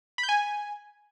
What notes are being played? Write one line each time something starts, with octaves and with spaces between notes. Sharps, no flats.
B5
G6
G#5